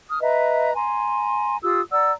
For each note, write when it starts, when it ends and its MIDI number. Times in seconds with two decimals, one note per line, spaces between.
0.09 0.19 87
0.09 0.19 89
0.22 0.73 71
0.22 0.73 75
0.22 0.73 76
0.22 0.73 82
0.75 1.56 80
0.75 1.56 82
0.75 1.56 84
1.63 1.80 65
1.63 1.80 67
1.63 1.80 87
1.63 1.80 88
1.91 2.12 74
1.91 2.12 78
1.91 2.12 82
1.91 2.12 88